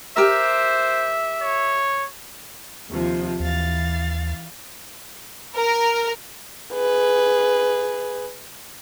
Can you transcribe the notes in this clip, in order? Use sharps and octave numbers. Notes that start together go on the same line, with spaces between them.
G4 A#4 C5 E5
C#5
D#2 C3 F3
D#2 E3 F5 A6
A#4
G#4 B4